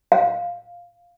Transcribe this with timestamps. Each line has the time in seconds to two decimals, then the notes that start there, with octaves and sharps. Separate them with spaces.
0.12 F5